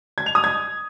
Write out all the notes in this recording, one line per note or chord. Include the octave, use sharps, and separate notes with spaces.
G#6
F7
D#6
G#6